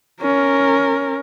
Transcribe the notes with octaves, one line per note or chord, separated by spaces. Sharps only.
C#4 A#4